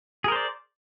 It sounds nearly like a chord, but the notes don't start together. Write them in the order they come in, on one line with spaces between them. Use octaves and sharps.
G#4 A#4 C5 D5